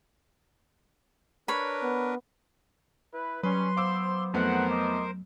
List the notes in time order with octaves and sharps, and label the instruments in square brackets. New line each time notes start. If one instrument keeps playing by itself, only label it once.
[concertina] D4 A#4 B4 [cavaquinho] C#5 B5
[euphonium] B3
[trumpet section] E4 B4
[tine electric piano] F#3 [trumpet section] G3 C#4 [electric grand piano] B4 [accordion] C6
[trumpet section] B3 C5 [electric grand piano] F5 D6 E6
[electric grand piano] F2 A3 B3 [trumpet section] D#4 F#5 [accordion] A#4 C5
[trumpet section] D#5 D6